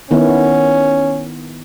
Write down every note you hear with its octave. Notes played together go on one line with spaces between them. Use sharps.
D#3 B3 C#4 E4